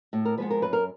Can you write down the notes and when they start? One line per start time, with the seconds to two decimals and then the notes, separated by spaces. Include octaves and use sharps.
0.13 A2
0.25 A#4
0.37 F3 G#3 B3 B4
0.51 A#4
0.62 F#2 B4
0.73 A#4